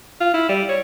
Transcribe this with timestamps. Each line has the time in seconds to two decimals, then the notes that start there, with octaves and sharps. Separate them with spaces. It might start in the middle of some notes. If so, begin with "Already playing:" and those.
0.21 F4
0.34 E4
0.49 G3
0.69 C#5